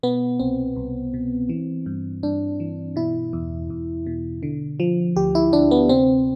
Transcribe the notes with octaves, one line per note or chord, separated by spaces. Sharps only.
B2 B3
C2 C4
C2
B2
E3
G2
G2 D4
E3
B2 E4
E2
E2
B2
D3
F3
D2 G4
E4
D2 D4
B3
C3 C4